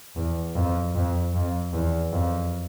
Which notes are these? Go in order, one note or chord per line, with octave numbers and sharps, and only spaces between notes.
E2
F2
F2
F2
E2
F2